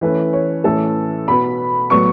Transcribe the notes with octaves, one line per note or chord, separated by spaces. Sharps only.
E3 A3 C#4 B4
C#5
A2 E3 A3 C#4 A4
B2 B3 B5
A2 F#3 B3 C#6